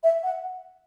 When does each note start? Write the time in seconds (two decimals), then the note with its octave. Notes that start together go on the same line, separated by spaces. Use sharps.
0.03 E5
0.23 F#5